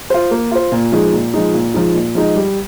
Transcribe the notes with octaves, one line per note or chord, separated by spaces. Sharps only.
F4 C5
A#3
F4 C5
A#2
F3 G#3 D#4
A#2
F3 G#3 D#4
A#2
F3 G#3 D#4
A#2
F3 G#3 D#4
G3